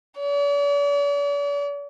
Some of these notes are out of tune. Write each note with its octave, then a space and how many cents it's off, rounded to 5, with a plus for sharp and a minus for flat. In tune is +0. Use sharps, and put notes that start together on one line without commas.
D5 -45